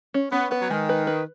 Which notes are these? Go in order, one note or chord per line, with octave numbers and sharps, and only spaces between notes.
C#4
B3 C#4
B3 B4
F#3
D#3 G#3
B4
B4